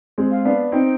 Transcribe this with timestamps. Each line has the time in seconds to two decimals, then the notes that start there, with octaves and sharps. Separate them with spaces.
0.18 G#3 C4
0.31 F5
0.45 B3 D4
0.72 C4 D#4 G5